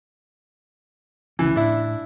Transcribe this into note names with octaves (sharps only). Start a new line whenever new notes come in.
C#2 C#3 E3 C#4
A2 D4 E4